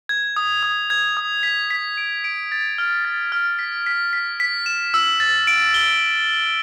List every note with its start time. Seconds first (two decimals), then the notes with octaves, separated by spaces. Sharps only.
0.09 G#6
0.36 D#6
0.63 D#6
0.90 G#6
1.17 D#6
1.43 B6
1.70 B6
1.97 D7
2.24 D7
2.52 A6
2.78 F6
3.05 A6
3.32 F6
3.59 B6
3.86 B6
4.13 B6
4.40 B6
4.66 E7
4.94 E6
5.20 A6
5.47 D7
5.74 G7